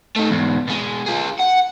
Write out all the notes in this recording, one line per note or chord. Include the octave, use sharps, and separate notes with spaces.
A3 D#4
E2 G#2
B2 G#3
F4 G#4
F#5